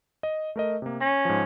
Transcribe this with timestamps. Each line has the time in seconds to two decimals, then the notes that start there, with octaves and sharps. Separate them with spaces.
0.23 D#5
0.56 A3 A#4 D#5
0.82 C3 A#3
1.01 C#4 A#6
1.25 G#2 F3